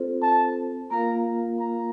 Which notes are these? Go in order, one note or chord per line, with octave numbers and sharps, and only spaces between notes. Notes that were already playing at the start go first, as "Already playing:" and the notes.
Already playing: C4 F4 A4 C5
A5
A#3 F4 A#4 F5 A#5
A#5